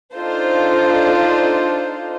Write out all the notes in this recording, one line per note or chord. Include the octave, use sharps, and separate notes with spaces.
D4 D#4 F4 A4 C5